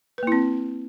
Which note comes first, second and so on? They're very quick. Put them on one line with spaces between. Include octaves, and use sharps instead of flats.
B4 A#3 E4 C4